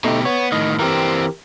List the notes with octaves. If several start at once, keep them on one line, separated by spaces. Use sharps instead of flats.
B2 A3 D#4 G4
B3 C#5
A2 D#3 D#5
E3 C4 G4 A#4